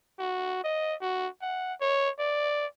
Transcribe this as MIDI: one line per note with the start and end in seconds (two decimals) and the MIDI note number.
0.19 0.63 66
0.64 0.94 75
1.01 1.28 66
1.42 1.73 78
1.81 2.09 73
2.19 2.66 74